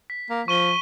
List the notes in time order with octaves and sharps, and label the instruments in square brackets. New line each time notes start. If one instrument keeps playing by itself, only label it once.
[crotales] B6
[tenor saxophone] A#3
[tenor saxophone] F3 [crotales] C#6 D#7 G7